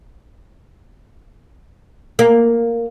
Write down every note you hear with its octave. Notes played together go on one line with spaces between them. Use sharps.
A#3